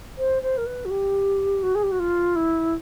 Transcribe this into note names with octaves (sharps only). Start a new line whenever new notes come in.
C5
C5
A#4
B4
F#4
G4
F#4
G#4
G4
F#4
F4
E4